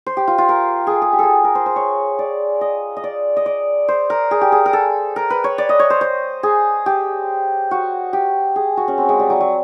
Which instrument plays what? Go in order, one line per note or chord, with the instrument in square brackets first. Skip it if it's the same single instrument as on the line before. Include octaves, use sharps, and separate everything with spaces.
[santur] C5
G4
F4
F4
A#4
G#4 A4
G#4
G4
G#4 A4
A#4
C5
C5
C#5
D5
D#5
D#5
D5
D#5
D5
C5
A#4
G#4
G4
G#4
A#4
A4
A#4
B4
C#5
D5
D#5
C#5
C5
C5
G#4
G4
F#4
G4
G#4
F#4
C#4
C4
G#3
G3
F#3
F#3